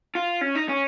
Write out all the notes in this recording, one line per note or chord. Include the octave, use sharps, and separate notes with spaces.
F4
C#4
D#4
C#4